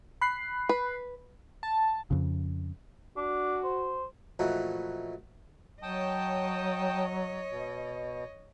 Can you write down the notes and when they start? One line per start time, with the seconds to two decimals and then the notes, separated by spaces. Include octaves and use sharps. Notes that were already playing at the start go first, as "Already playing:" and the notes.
0.21 B5 F#6 C7
0.69 B4
1.63 A5
2.11 F2 C#3
3.17 D4 F#4
3.64 C5
4.39 A#2 E3 F3 A3 D#4 F#4
5.83 F#3 C#5 D#5 G5 A5 D#6
7.51 B2